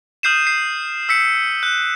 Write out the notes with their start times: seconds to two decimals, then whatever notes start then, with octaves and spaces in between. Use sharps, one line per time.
0.23 D#6 F6 G6 C7 D#7 E7
0.47 C7
1.09 E6 B6 C#7
1.63 F#6